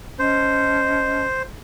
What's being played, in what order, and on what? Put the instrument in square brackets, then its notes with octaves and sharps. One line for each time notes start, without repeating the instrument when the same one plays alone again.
[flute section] C#4 D#5 A5 [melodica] C5